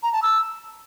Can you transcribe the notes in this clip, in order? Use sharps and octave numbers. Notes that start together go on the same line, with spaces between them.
A#5
A5
E6